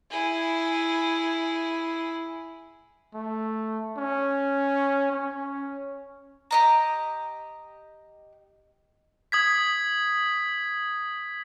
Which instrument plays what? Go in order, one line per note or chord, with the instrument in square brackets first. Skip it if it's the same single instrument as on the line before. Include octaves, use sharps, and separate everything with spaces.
[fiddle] E4 G#4
[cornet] A3
C#4
C#4
[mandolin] G4 D#5 A#5
[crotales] D#6 G#6 B6